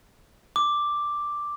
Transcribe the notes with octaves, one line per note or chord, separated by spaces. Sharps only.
D6